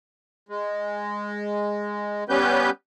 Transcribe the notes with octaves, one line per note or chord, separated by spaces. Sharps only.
G#3
G3 B3 C#4 G4 B4 G6